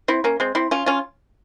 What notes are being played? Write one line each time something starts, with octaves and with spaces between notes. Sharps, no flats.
C4 E4
A#3 C#4
G#3 C4
C4 E4
C#4 F4
C#4 F4